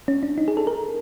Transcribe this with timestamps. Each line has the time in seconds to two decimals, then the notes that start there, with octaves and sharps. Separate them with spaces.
0.08 C#4
0.23 D4
0.38 D#4
0.48 G#4
0.57 A4
0.67 A#4